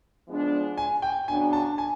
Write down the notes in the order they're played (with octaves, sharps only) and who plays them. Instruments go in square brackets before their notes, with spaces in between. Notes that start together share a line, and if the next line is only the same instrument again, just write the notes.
[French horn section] F3 G#3 B3 D4
[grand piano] G#5
G5
[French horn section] C#3 F#3 B3 D4 [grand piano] G#5
[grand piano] A5
G#5